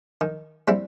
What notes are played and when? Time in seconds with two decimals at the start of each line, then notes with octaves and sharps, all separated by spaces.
0.21 D#3
0.68 G3 C4 E4